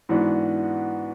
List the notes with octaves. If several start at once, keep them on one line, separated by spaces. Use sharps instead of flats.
G#2 E3 B3 D4 F#4